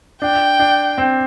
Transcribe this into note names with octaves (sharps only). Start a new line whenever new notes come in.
D4 G5
D4
C4